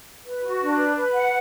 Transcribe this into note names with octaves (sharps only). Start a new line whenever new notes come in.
B4
F#4
D4
B4
B4
F#5